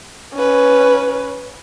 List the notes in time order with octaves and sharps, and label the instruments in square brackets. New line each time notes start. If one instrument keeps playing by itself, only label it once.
[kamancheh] C#4 B4